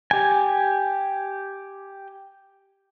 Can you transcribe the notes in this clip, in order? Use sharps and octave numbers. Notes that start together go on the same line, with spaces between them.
G4 G#5